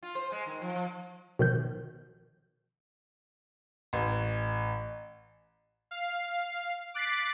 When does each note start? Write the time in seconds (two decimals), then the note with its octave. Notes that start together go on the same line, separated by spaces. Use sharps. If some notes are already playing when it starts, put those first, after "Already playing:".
0.03 F4
0.15 C5
0.32 G#3
0.46 D#3
0.61 F3
0.76 F3
1.39 B2 D#3 F3 G6
3.93 A1
5.91 F5
6.94 D6 F#6 A6 B6 C7